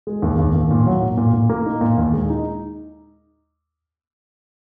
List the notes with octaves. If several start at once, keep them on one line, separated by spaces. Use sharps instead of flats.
G#3
D#2
D#2
D#2
A#2
F#3
A#2
A#2
A#2
A#3
D#4
A#2
D#2
G#3
D#4